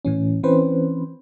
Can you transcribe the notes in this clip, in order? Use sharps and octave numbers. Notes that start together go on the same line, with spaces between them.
A2 E3 C#4
E3 C4 C#4 B4 C5